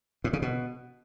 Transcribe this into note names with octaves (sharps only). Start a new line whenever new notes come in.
A2
C#3
B2